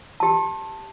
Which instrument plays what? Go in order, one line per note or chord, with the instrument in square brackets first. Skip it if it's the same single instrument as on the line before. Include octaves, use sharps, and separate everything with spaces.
[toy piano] G4 A5